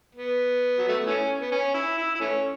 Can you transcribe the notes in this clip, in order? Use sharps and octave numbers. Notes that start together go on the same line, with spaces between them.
B3
F#3
A3
B3
E3 A3 C#4
B3
C#4
E4
E4
E4
E3 A3 C#4